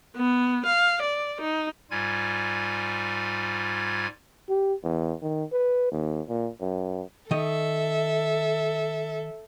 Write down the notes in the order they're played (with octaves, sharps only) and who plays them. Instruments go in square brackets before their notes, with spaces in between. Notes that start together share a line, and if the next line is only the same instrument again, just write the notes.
[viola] B3
F5
D5
D#4
[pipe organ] G#2 G3 F4 G#5 G#6
[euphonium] G4
E2
D#3
B4
D#2
A#2
F#2
[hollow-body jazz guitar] D#3 D#5 [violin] A4 E5